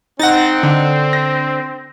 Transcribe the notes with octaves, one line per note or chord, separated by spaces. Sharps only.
C4 D#4 F#5 A6 A#6
D3
A#6